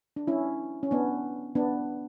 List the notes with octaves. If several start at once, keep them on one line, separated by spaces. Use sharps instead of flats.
D4
C#4 E4
C#4
B3 D4
B3 D4